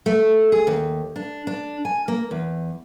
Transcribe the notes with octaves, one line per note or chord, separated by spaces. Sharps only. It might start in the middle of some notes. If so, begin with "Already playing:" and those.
A3
G#4
D#2
D4
D4
G#5
A#3
E2